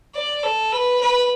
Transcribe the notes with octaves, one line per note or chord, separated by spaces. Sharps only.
D5
A4
B4
B4